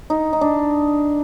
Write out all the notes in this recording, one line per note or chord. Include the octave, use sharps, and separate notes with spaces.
D#4
D#4
D4